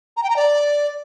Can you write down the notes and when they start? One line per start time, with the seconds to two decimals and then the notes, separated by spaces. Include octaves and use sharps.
0.17 A#5
0.23 G5
0.30 A#5
0.36 D5